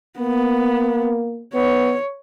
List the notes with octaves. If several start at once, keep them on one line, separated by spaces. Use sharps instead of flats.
A#3 B3
B3 C#5